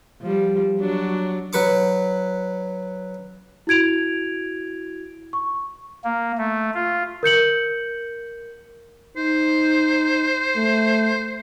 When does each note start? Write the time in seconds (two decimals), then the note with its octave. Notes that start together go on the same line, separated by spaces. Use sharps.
0.22 F3 G3
0.80 F#3 D4 F#4
1.53 F#3 B4 C#6 D6
3.67 E4 F#4 G#6 D7 F7
5.33 C#6
6.04 A#3
6.38 A3
6.74 F4
7.23 A#4 G6 C#7 F#7
9.17 D#4 C5
10.56 A3